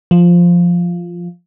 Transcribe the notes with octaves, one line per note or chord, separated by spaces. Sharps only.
F3